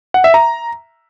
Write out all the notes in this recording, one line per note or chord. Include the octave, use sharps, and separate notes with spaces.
F#5
E5
A#5